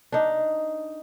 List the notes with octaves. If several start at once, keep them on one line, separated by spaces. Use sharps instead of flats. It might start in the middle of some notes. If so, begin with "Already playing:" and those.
D4 D#4